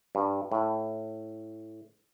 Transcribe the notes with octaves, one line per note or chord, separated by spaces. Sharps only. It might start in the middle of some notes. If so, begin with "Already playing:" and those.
G2
A2